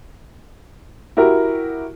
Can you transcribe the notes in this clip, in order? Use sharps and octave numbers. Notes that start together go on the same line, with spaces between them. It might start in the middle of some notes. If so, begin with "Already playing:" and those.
E4 F#4 G4 A#4